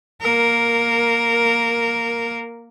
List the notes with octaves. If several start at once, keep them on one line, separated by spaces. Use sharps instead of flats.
A#3 A#4